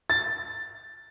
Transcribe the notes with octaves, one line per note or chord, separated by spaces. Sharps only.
A6